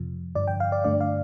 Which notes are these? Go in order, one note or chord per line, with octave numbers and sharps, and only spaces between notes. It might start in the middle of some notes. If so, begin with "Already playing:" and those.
Already playing: F2 C3 F3
G2 D3 F3 D5
G5
F5
D5
G2 D3 A3 D4 D5
F5